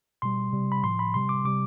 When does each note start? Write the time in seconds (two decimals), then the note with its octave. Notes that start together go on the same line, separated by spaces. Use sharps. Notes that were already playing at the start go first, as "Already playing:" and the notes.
0.22 B2 G3 C6
0.53 C3 G3
0.72 B5
0.84 A2 F3 C6
0.99 B5
1.14 C3 G3 C6
1.29 D6
1.45 C3 G3 D6